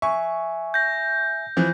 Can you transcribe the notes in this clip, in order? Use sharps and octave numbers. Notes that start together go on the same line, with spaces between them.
E5 G#5 C#6
G6 A#6
E3 F3